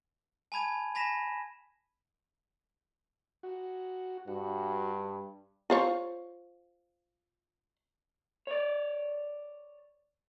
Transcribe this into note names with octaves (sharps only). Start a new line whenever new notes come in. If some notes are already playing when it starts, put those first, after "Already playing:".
G#5 A5 B5 G#6 D#7
G#5 B5 A#6 B6 E7
F#4
G2 F#4
F4 C5 C#5
C#5 D5